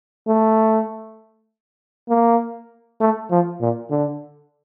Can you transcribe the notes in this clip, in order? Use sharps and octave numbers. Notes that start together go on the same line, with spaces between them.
A3
A#3
A3
F3
A#2
D3